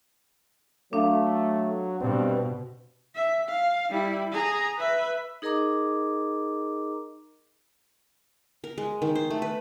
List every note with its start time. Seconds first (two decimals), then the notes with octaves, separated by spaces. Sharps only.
0.93 F#3 A3 D4 F5
2.01 G2 B2 C4
3.16 E5
3.49 F5
3.90 G3 E4
4.32 G#4 A#5
4.78 B4 E5
5.42 D#4 G#4 A#4 D#5 A#5 D6
8.64 A#4
8.78 G#3
9.02 D#3
9.15 C5
9.30 A3
9.42 B4